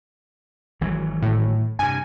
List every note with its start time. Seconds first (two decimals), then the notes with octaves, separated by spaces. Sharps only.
0.81 G#1 E3 F#3
1.22 A2
1.79 G2 C3 G#5